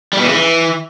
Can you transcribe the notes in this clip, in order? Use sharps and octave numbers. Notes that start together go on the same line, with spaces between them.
G3
B2
E3
C#3
E3